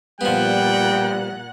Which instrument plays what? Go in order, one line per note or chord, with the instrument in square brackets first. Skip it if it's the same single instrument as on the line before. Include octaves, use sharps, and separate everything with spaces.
[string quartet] A#2 F#5 F#6 [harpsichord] F3 B3 [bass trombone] G3 [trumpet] G5